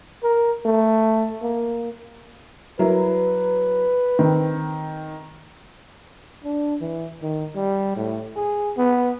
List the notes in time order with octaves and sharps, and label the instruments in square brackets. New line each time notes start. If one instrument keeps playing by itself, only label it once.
[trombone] A#4
A3
A#3
[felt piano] F#3 E4 A#4 [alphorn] B4
[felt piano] D#3 C4
[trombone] D4
E3
D#3
G3
A2
G#4
B3